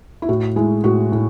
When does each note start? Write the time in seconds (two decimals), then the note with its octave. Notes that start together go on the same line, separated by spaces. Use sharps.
0.22 E4
0.29 A2 F#4
0.56 G#3 E4
0.84 A2 F#4
1.12 A2